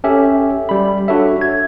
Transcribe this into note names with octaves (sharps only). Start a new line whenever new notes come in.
C#4 G4 A4 E5
G3 B5
D4 F#4 A4 C#5 E5
G#6